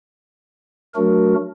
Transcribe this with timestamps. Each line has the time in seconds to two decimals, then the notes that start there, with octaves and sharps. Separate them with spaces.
0.94 F#3 A3 D4 F#4 A#4